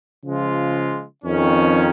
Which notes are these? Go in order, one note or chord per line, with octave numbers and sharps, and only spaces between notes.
C#3 F3 G#3 F4
F2 D#3 C#4